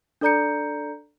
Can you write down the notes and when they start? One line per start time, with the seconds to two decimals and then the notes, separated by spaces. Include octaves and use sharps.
0.21 D4 A4 D5 A#5 G6 C#7